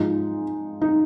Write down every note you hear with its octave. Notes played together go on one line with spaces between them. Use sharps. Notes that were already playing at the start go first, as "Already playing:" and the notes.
Already playing: G#2 F3 G#3 D#4
D#4